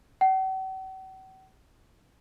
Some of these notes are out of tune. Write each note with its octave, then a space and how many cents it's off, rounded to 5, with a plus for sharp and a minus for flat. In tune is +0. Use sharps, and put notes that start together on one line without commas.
F#5 +45